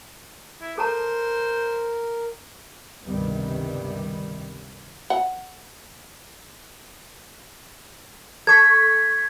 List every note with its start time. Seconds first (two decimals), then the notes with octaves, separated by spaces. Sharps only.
0.61 E4
0.78 A4 A#4 C5 A5 A#5
3.04 C#2 G2 C3 D#3 G3 B3
5.10 F#5
8.47 A4 C#6 G#6 B6